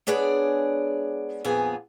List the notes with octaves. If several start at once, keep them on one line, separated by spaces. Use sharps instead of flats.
G#3 B3 D4 G#4 C#5 D5
F2 A#2 D3 B3 G#4 G#5